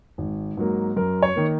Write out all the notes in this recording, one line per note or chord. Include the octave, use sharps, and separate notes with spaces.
G#1
G#2 F#3 A#3
F#2 A#4
C#5
D#3 A#3